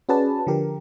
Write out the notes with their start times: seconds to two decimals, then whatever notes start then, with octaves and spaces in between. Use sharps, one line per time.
0.09 C#4 F#4 G#4 B4 D5 A5
0.47 D3 F3 G4 A#4